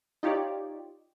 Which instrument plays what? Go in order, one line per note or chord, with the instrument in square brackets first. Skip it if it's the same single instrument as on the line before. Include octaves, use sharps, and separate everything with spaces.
[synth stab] D#4 F4 G4 C#5 D5